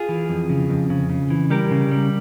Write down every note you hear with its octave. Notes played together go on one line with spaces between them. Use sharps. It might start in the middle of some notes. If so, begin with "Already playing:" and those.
Already playing: F4 G#4
E3
F2
C#3
F2
C#3
C#3
E3
G3 G4 A#4
C#3
G3